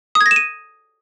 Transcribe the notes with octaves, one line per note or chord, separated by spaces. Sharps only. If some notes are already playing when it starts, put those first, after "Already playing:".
D#6
G#6
A#6
E7
D#7